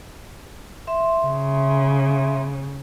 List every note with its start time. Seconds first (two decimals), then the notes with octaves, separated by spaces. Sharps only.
0.87 E5 C6
1.26 C#3